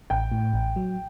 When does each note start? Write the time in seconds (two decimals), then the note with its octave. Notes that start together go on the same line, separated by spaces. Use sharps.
0.10 A1 G5
0.32 A2
0.53 A1
0.76 F#3